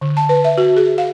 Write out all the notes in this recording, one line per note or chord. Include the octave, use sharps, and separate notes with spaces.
D3
A5
B4
E5
F#4
G#4
F5